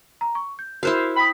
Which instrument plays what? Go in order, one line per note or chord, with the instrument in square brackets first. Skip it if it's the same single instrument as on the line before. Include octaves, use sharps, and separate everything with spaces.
[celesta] A#5
C#6
G6
[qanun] E4 C5 F5 [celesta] F#4 A#4 F#6
[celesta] G5 D#6 [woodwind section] B5